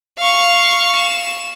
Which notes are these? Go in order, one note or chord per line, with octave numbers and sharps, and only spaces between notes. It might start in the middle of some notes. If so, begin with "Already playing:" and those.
F5 C#6
E7